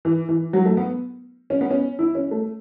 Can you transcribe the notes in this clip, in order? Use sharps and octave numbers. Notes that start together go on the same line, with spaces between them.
E3
E3
F#3
A3
B3
C#4
B3
C#4
E4
C#4
A3